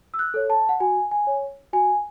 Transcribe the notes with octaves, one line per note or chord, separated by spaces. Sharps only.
E6
F#6
A4 C#5
A5
F#5
F#4 G#5
G#5
C#5
F#4 G#5